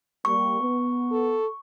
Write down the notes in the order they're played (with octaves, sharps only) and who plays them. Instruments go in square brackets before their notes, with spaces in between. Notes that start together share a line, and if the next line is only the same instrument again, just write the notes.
[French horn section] G3 A#3 [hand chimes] C#6
[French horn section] B3
[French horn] A4